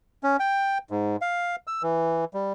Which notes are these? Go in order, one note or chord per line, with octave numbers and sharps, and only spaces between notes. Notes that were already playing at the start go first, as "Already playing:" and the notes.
C#4
G5
G#2
F5
E6
E3
G3